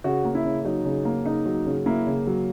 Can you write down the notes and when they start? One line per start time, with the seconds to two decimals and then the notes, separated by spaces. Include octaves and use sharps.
0.04 C#3 F#4
0.25 A#3
0.35 E4
0.45 C#3
0.65 F#3 D#4
0.85 C#3
1.05 A#3
1.25 C#3 D#4
1.46 F#3
1.66 C#3
1.86 A#3 E4
2.07 C#3
2.27 F#3